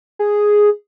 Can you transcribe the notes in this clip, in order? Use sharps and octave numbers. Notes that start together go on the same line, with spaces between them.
G#4